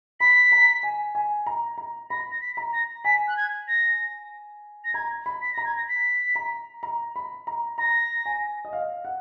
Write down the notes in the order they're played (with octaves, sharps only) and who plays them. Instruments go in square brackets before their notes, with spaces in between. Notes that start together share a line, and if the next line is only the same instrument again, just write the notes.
[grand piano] B5 [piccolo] B6
[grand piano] A#5
G#5
G#5
A#5
A#5
[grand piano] B5 [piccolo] A#6
[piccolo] A#6
B6
[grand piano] A#5
[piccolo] A#6
[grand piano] G#5 [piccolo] B6
[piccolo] F#6
G#6
A#6
A#6
[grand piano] A#5 [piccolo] G#6
[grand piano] B5
[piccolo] B6
[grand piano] A#5 [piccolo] A#6
[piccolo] G#6
A#6
B6
[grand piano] A#5
A#5
B5
A#5
[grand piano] A#5 [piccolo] A#6
[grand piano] G#5
D#5
F5
F#5